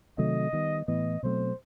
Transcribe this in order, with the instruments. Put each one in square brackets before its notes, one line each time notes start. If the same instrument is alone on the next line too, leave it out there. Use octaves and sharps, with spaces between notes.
[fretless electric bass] C3 D#3 F#3 A3 [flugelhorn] D#5
[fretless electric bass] D#3 G3 B3
[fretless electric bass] A2 E3 B3 [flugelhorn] D#5
[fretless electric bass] B2 F#3 A3 C4 [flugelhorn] C5